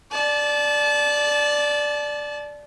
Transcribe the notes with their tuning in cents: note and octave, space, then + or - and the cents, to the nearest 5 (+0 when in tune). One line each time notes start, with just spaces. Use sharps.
D5 +0 A5 -25